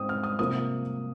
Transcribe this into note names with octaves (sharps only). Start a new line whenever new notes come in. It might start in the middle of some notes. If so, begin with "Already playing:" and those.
Already playing: G#2 G#3 C4 D#6
F6
D#6
C3 F3 A#3 D#6